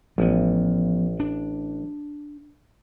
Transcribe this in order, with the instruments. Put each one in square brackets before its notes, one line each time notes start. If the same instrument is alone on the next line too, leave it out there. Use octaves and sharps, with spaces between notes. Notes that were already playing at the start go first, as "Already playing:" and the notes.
[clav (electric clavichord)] A1 [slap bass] F3 B3
[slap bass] D4